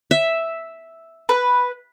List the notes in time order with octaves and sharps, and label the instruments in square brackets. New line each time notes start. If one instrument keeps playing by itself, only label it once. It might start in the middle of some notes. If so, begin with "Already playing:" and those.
[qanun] E5
[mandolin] B4